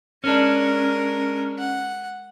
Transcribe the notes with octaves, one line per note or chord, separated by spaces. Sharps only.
G#3 C#4 D4 A#4
F#5